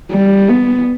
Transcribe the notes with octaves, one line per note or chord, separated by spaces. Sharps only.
G3
B3